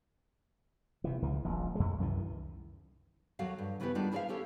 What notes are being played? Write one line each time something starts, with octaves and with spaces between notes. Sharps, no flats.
C3 E3
C#2 E3
D#1 A#1
F2 G#3
C2 F#2 D#3 E3
D#2 F#3 F#4 A4 F5
G2
C#3 E3 B3 E4 G4 B4
D#3 G3 G#3 B3 D4 F4
E4 G#4 A#4 D5 E5 F5
C#4 G4 A4 C#5